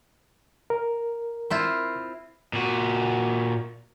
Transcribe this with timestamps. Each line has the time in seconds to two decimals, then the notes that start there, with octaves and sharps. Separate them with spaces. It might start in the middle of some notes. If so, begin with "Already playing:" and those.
0.70 A#4
1.50 C4 E4 F4
2.53 A#2 F#4